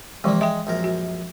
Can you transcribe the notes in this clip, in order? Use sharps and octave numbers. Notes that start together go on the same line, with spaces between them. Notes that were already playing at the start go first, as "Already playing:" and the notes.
C3 E3 F3 G#3 A#3
G#3 E5 G5
A#1 F#2 A#4
F#4